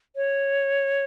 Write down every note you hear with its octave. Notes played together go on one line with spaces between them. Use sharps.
C#5